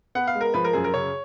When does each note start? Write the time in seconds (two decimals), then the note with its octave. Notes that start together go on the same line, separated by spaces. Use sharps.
0.15 B3 F#5
0.27 F5
0.35 G#3
0.41 A#4
0.54 F3 B4
0.64 A#4
0.73 F#2 G#4
0.84 A#4
0.94 C#3 C#5